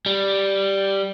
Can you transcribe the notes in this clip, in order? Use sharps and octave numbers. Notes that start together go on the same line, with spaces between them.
G3